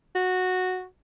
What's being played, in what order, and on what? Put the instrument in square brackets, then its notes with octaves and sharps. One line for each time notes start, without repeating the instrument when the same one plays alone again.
[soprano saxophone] F#4